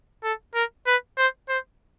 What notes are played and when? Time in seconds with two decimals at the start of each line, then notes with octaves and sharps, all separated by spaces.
0.23 A4
0.54 A#4
0.87 B4
1.18 C5
1.49 C5